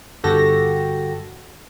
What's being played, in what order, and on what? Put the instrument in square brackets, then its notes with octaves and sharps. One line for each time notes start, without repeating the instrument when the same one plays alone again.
[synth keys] G1 F#4 G4 A4 A#6